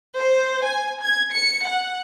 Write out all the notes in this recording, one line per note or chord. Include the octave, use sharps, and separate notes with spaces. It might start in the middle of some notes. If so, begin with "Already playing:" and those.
C5
G#5
G#6
C#7
F#5